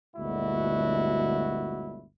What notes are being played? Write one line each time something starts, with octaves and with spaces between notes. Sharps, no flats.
G1 D2 A#2 G#3 E4 F#4